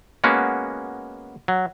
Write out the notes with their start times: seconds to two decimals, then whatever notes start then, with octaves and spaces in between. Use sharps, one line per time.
0.24 G#3 A#3 B3 C#4 F#4
1.48 F#3